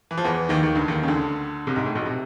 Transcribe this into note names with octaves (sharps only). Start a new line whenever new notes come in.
E3
F3
E2 E3
D#2 D#3
D#2 D#3
D2 D3
D#2 D#3
C#3
D2 D3
C2 C3
G#2
A2
B1 B2
C3